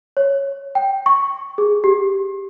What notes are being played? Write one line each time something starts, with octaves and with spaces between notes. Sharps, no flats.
C#5
G5
C#6
G#4
G4